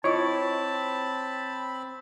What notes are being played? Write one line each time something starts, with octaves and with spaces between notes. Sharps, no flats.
C4 E4 F4 C#5 D#5 A5 B5